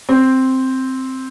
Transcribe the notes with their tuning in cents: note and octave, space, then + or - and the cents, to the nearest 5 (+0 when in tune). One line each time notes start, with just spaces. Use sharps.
C4 +0